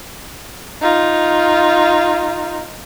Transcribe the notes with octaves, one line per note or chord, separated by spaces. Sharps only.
D#4 F4